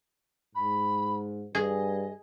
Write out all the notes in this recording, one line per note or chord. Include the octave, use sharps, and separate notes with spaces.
G#2 B5
G2 G#4 D#5